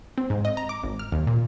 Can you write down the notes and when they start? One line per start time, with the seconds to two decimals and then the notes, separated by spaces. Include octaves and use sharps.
0.18 C4
0.30 G#2
0.45 D#5
0.57 A#5
0.69 D6
0.83 G#1
0.99 F6
1.12 D#2
1.27 A#2